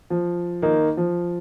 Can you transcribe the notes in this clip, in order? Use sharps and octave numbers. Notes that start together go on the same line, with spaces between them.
F3
D#3 A#3 D#4
F3